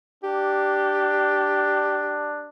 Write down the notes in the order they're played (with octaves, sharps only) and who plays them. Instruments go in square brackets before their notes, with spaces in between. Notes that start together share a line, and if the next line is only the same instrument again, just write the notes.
[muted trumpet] D4 [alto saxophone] G4